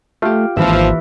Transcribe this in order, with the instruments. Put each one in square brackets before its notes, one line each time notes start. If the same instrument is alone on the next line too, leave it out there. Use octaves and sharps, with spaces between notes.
[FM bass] A3 [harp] F4 G4
[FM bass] G#1 [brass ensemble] D#2 F3 [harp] E3 E5